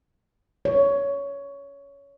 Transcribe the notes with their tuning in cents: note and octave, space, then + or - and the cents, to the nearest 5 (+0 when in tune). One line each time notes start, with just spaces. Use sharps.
C#5 +15